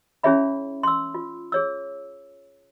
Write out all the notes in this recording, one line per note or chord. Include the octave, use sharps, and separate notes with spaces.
C#4 E4 G#4 C#5 E5 B5
C6 E6
F4
G#4 C#5 E6